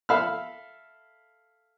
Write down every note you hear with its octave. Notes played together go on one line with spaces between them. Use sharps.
A4 E5 F5 B5 F6